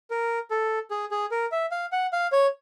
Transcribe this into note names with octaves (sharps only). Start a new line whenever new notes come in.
A#4
A4
G#4
G#4
A#4
E5
F5
F#5
F5
C#5